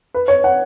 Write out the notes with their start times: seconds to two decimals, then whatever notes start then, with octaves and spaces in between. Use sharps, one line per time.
0.14 B4
0.28 C#5
0.44 F#5